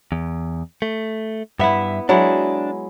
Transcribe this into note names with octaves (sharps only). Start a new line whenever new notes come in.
E2
A3
G2 B3 E4 E5
F#3 G#3 D4 E4